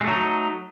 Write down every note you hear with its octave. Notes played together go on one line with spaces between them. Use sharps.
F#3 G#3 A3 D#4